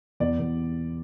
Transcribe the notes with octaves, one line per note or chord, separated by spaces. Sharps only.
E2 D5
E2